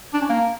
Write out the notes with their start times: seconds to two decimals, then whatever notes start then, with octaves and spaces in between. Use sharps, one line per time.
0.14 D4
0.21 C#4
0.29 A#3